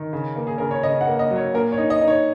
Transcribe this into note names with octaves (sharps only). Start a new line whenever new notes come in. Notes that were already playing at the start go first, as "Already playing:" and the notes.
Already playing: D#3
C#3
A#3
G#4
C#3 A#4
C#5
C#3 D#5
F#5
A#3
D#5
F#3
C#5
A#2 A#4
C#5
D#4
D#5
D#4
C#5